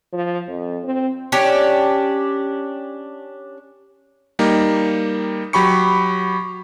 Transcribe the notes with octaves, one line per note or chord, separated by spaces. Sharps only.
F3
F2
C4
C#4 D4 G4
G3 A#3 D#4
F#3 G4 B5 C#6 C#7